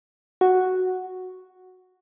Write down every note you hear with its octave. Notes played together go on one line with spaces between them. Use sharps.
F#4